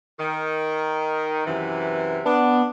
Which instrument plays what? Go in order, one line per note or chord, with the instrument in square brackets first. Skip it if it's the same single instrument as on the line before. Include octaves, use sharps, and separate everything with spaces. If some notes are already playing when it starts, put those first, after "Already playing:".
[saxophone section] D#3
F#2 C3 E3
[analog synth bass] B3 [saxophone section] D4